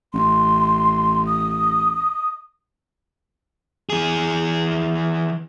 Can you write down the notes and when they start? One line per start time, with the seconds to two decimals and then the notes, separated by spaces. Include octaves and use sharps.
0.14 A1 C6
1.27 D#6
3.90 E3 G#4